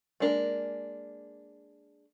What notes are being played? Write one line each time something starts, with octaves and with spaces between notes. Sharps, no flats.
G#3 A#3 D4 A#4